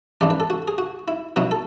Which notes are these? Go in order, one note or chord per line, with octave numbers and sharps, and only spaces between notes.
A1 G#2 E3 B3 D4 D5
B4
A4
F#4
G#4
F#4
E4
B2 F#3 B3 E4 F#4
A4